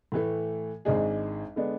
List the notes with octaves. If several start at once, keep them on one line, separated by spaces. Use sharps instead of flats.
A2 E3 A3
G#1 G#2 G#3 D4 G#4
D3 G#3 B3 D4